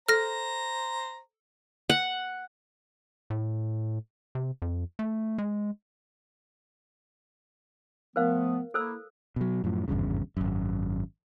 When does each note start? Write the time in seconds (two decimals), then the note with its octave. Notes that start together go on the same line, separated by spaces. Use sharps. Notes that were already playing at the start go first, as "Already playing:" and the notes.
0.09 A4 C5 A#5 F6 A#6
1.90 F#5
3.30 A2
4.35 C3
4.62 F2
4.99 A3
5.38 G#3
8.16 F3 A3 B3 A#4 C5 F5
8.74 A#3 E4 A4 C5 E6
9.36 B2 F#3
9.64 F#2 A2 F3
9.88 G#1 E2 G2 C#3
10.37 G#1 F#2